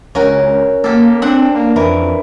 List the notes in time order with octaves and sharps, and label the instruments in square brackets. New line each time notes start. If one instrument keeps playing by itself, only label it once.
[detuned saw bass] C#2 [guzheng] C#4 F#4 A#4
[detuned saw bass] A#3 [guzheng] G4 A4
[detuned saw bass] C4 [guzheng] D4 F#5
[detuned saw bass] A#3
[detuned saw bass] F2 [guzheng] E3 A#4